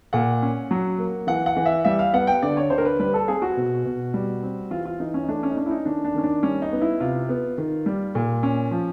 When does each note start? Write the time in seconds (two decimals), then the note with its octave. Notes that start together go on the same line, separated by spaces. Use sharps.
0.13 A#2 F#5
0.42 C#4
0.71 F#3
0.98 A#3
1.27 E3 F#5
1.46 F#5
1.56 E3
1.66 E5
1.85 G3 E5
1.99 F5
2.13 B3 F#5
2.27 G5
2.42 D3 D5
2.57 C#5
2.70 D3 C5
2.78 A#4
2.85 B4
2.99 G3 B4
3.14 A4
3.28 C4 G#4
3.42 F#4
3.57 B2
3.85 B2
4.14 G3
4.43 C4
4.71 E3 F4
4.85 F4
5.00 E3 D#4
5.14 C#4
5.23 D#4
5.29 A3 D4
5.43 C#4
5.51 D#4
5.57 C#4 D4
5.66 E4
5.71 D#4
5.85 D#3 D4
6.05 D4
6.14 D#3 C#4
6.24 D4
6.43 G3 C#4
6.62 D#4
6.72 B3
6.81 E4
7.00 C3 F4
7.29 B3
7.58 D#3
7.86 G3
8.15 A#2
8.43 C#4
8.71 F3